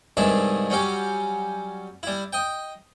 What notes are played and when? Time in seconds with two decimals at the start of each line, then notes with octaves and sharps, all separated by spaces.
0.17 C2 G2 D#3 G#3 D4 E5
0.70 F#3 G3 C#4 G4
2.03 G3 E4
2.33 D#5 G5